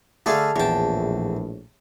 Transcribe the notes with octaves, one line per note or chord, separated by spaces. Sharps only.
D3 A3 G#4 A4 F5
A#1 E2 A2 C#5 G5 A5